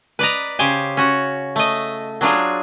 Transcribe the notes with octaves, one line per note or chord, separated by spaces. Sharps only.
B4 D5 D#5 A#5
C#3 G4 C5 G#5
C#4 F#4
A3 D#5
F#3 D4 F4 G#4